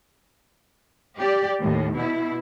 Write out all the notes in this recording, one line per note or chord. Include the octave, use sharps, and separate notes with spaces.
G4 D5
D#2 A2
B2 E4